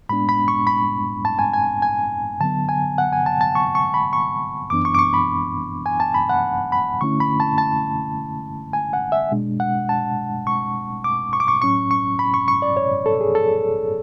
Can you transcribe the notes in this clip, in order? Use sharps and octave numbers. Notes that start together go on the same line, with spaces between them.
A2 G#3 B3 D4 B5
B5
C#6
B5
A5
G#5
G#5
G#5
D3 F#3 B3 A5
G#5
F#5
G#5
A5
A5
C#6
C#6
B5
C#6
F#2 E3 B3 D4 D6
C#6
D6
C#6
B5
G#5
A5
B5
F#5
B5
D3 A3 C#4 E4 C#6
B5
A5
A5
G#5
F#5
E5
B2 G#3 D4
F#5
A5
C#6
D6
C#6
D6
C#6
A2 F#3 C#4 C#6
C#6
B5
C#6
C#6
D5
C#5
A4
G#4
A4